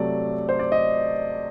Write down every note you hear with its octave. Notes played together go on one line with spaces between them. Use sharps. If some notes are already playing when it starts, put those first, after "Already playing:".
Already playing: C3 F#3 A3 D5
C5
D5
D#5